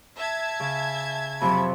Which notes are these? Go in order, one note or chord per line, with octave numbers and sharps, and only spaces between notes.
E5 A5 G#6
C#3
F2 C3 F#3 B5